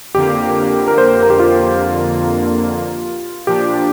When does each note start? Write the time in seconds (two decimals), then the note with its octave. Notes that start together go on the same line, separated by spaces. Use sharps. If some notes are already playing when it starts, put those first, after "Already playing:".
0.15 F2 D3 A#3 G4
0.88 A#4
0.98 C5
1.22 A#4
1.30 G4
1.40 F4
3.47 A#2 F3 D4 G4